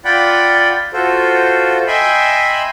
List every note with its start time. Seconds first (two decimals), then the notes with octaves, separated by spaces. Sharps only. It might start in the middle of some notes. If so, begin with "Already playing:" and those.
0.05 F4 D5 F#5 G5 B5
0.93 F4 F#4 A4 C5
1.87 D#5 E5 G5 G#5 B5 C6